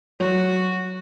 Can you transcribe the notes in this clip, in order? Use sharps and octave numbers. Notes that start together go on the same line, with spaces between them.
F#3 F#4